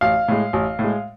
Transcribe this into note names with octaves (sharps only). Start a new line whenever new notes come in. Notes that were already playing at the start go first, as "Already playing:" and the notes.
A1 F5
A2 G#3
A1
A2
G#3